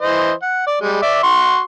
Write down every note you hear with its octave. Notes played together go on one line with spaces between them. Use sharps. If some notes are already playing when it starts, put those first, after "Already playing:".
E3 C5 D#5
F#5
D5
G3 G#3
D5 E5 D6
F#4 C6 C#6